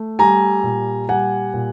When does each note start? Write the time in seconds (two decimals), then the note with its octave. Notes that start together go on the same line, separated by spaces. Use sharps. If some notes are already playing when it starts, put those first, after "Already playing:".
Already playing: A3
0.19 G3 G#5 A#5
0.63 A#2
1.09 G3 F#5 G#5
1.54 A#2